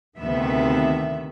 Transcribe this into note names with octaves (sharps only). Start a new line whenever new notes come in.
D2 C3 D#3 B3 E5